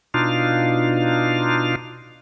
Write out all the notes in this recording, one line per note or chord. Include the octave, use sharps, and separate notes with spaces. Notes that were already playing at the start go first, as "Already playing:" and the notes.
B2 D4 D#4 F4 F5